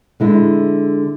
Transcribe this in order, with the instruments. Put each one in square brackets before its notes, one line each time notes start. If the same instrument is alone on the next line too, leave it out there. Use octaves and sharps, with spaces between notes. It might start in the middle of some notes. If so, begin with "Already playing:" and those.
[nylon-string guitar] D3 G#3 E4